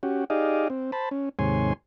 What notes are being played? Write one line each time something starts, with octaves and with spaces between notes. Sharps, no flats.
C#4 F#4 G4
D#4 G4 G#4 D5 D#5 F5
C4
C5 A5 B5
C#4
D#2 G#2 C3 C#5 G#5 C6